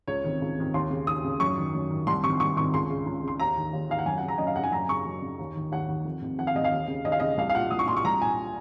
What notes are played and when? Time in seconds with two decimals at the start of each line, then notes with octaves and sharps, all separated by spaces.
0.08 C#2 C#5
0.24 C3 D#3
0.42 C#2
0.58 C3 D#3
0.74 D#2 C6
0.91 C#3
1.07 D#2 D#6
1.24 C#3
1.40 F#2 C#6
1.58 D#3
1.74 F#2
1.91 D#3
2.07 C2 C6
2.23 C3 D#3 C#6
2.40 C2 C#6
2.56 C3 D#3 C#6
2.74 C#2 C6
2.90 C#3
3.06 C#2
3.23 C#3 C6
3.40 D#2 A#5
3.56 D#3
3.73 D#2
3.89 D#3 F5
3.99 F#5
4.06 F#2 G#5
4.18 F#5
4.22 C#3
4.28 A#5
4.38 F#2 D#5
4.47 F5
4.56 C#3 F#5
4.64 G#5
4.72 F#2 A#5
4.88 C#3 C#6
5.06 F#2
5.22 C#3
5.39 D#2
5.55 D#3
5.72 D#2 F#5
5.89 D#3
6.05 F2
6.21 C3 D#3
6.38 F2 F#5
6.47 F5
6.55 C3 D#3 D#5
6.64 F5
6.71 D#2
6.88 C#3
7.04 D#2 D#5
7.12 F5
7.20 C#3 D#5
7.37 C2 F5
7.49 F5
7.55 A#2 F#5
7.71 C2 D#6
7.79 C#6
7.87 A#2 C6
7.97 C#6
8.04 C2 A#5
8.21 A#2 G#5